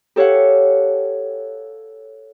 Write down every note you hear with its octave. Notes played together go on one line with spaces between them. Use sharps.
G4 A4 C#5 F5 F#5